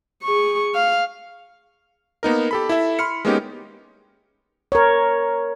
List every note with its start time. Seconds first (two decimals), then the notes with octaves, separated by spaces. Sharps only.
0.23 G#4 C#6
0.75 F5
2.23 A#3 B3 D#4 A#4
2.51 G4 A4 B5
2.69 E4 A4 E5
2.99 B5 C6 F6 C#7
3.25 G#3 A#3 B3 C#4 D#4 G4
4.72 A#4 C#5